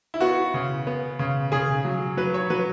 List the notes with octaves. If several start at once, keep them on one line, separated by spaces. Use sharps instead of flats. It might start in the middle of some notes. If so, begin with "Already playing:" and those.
E4
B3 F#4
C#3
B3
C#3
C#3 G#4
F#3
F#3 B4
C#5
F#3 B4